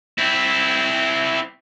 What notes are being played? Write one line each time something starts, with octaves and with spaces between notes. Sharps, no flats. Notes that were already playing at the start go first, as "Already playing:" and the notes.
C4 E4